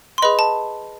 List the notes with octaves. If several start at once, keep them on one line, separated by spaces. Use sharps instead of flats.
C6
G#4 B4 D#5 B5
A5